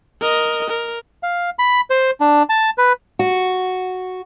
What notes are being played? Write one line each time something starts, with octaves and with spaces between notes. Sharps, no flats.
A#4 D#5
A#4
F5
B5
C5
D4
A5
B4
F#4